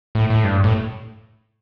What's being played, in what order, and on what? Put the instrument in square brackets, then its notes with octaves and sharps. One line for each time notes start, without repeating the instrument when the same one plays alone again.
[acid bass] A2
A2
G2
A2